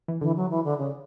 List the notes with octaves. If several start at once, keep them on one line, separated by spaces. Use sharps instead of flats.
E3
D3 E3
F#3
E3
D3
C#3